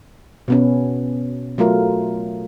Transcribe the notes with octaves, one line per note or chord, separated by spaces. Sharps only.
B2 B3 C#4
F#3 A3 F4 A#4